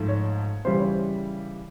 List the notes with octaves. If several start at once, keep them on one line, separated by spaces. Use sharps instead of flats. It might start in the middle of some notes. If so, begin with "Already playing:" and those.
Already playing: G#2 F3 A3
C#5
C#3 E3 G3 C5
C#5